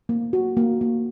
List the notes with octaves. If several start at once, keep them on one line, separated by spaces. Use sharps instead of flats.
A#3
F#4
A#3
A#3